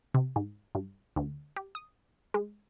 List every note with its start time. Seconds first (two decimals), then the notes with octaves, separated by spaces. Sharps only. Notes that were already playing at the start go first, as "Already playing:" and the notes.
0.14 C3
0.36 G#2
0.75 G2
1.16 D2
1.56 G4
1.75 D#6
2.34 G#3